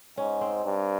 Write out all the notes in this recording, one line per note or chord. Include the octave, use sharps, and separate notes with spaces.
G#2 C#4
C4
G2